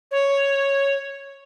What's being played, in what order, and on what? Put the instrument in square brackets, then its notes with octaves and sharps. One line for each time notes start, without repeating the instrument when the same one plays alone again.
[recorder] C#5